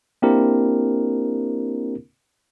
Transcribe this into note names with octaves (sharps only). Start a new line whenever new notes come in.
A#3 C4 D4 E4 G4 A#4